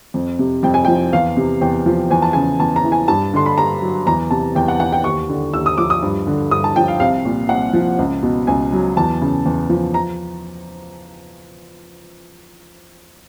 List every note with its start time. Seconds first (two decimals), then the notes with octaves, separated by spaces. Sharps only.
0.14 F2
0.39 C3
0.63 F2 G5
0.74 G#5
0.85 F3 G5
1.13 E2 F5
1.37 C3
1.61 E2 G5
1.86 F3
2.10 E2 G#5
2.22 A5
2.33 C#3 G#5
2.60 E2 A5
2.76 A#5
2.84 E3
2.92 G#5
3.08 G2 A5
3.33 D3 C6
3.46 B5
3.58 G2 A#5
3.82 F#3
4.07 E2 A#5
4.31 C3 A5
4.55 E2 G5
4.68 F#5
4.79 E3 F#5
4.92 G5
5.04 D#2 C#6
5.29 D3
5.53 D#2 E6
5.66 D#6
5.78 F3 D6
5.90 D#6
6.02 G2
6.27 D3
6.51 G2 D#6
6.64 A5
6.76 F3 G5
6.88 F5
7.00 C2 F5
7.25 A#2
7.49 C2 F#5
7.73 F3
7.99 C#2
8.23 B2
8.47 C#2 G#5
8.72 F#3
8.97 E2 A5
9.21 C#3
9.46 E2
9.69 F3
9.94 A#5